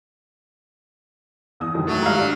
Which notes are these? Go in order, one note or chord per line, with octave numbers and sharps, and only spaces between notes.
E2 D#6
C2 F#2 D#3
F#3 A3
G#2 G3 G#3 F5 A#5
D4